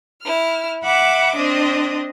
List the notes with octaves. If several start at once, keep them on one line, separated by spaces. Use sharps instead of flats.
E4 F6
E5 F#5 B5 D6
C4 D4 D#5